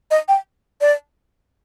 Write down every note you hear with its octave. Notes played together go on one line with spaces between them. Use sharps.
D#5
G5
D5